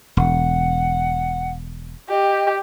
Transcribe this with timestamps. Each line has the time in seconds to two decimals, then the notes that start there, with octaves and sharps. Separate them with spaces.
0.17 E1 F#5
2.10 G4 D#5